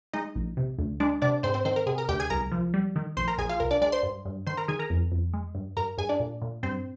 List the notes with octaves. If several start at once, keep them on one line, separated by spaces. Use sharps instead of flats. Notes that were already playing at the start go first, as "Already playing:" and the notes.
G#3 D#4 D#5
A#1
C3
D2
G#3 D4 D5
C3 D4 D5
G#2 C4 C5
C4 C5
D#3 C4 C5
A#4
C3 G#4
A#4
D2 G4 G5
G#4 G#5
C2 A#4 A#5
F3
G3
D#3
A#1 C5 C6
A#4 A#5
A#1 G#4 G#5
F4 F5
C2 A#4
D4 D5
G#3 D4 D5
C5 C6
G2
G2
D#3 C5 C6
A#4 A#5
D#3 G#4 G#5
A#4 A#5
F2
F2
G#3
G2
G2 A#4 A#5
G2 G#4 G#5
D4 D5
A#2
A#2
G2 C4 C5